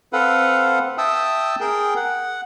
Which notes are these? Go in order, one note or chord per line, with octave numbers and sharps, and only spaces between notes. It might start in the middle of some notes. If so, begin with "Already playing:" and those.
C4 A4 B4 F5 F#5
E5 G5 A5 D#6 E6
G#4 A#4 G5
F#5